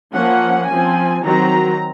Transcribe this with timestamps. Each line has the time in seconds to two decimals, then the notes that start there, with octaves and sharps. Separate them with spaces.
0.15 F3 A#3 C#4 F#5
0.70 F3 C4 G#5
1.25 D#3 F#3 C4 A#5